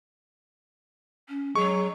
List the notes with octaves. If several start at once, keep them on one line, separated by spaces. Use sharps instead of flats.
C#4
F#3 G#3 C#6